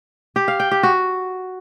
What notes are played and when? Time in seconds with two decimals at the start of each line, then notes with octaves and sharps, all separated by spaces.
0.36 G4
0.48 F5
0.60 G5
0.71 G4
0.83 F#4